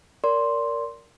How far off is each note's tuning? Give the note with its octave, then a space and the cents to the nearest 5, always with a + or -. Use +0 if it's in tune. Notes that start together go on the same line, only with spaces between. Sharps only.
A#4 +0 D5 -25 C6 +0